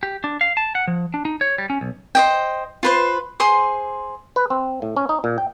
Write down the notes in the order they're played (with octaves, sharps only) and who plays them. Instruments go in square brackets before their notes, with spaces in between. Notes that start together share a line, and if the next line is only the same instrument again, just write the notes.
[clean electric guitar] G4
D4
F5
A5
F#5
F3
D4
D#4
C#5
G3
C#4
B1
[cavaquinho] C5 D#5 G5
F4 B4 C5
G#4 C5 C6 D#6
[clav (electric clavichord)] B4
C4
A2
C#4
D#4
A#2
G5